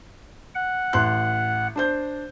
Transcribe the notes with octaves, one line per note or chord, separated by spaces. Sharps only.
F#5
A1 C6 F#6
D4 C5 G6